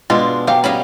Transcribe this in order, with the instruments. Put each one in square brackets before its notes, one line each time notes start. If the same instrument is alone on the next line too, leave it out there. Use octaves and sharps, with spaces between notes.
[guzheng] B2 [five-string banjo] G#3 D4 F4
[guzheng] F#3 [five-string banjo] G4 F5 [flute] G5
[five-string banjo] G3 C#4 C#5 [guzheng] D#5 F5 B5